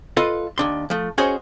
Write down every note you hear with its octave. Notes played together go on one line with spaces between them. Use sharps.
F4 A4 B4 D#5 F5
D#2 D4 C6
F3 A3
C#4 F#4 G#4 C5 C#5 D#5